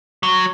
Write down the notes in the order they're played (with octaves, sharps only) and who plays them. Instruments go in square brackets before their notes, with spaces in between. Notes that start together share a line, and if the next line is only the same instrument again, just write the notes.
[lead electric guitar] F#3